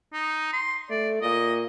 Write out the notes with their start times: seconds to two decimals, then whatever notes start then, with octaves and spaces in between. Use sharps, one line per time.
0.13 D#4
0.53 C6
0.90 A3 D5
1.22 A#2 D#5